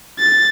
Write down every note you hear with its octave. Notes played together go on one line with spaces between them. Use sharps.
A6